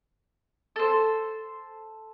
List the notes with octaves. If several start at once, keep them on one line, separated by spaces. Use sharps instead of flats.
A4 C5